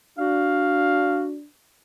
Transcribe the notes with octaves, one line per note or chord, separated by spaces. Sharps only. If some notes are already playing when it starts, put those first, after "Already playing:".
D4 F#4 F5